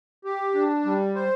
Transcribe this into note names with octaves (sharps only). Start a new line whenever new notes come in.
G4
D4
G3
C5